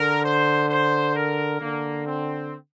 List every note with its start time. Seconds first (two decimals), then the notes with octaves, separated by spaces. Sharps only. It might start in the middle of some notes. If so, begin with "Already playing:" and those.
Already playing: D3 A#4
0.24 C5
0.70 C5
1.15 A#4
1.61 D3 A#3
2.07 C4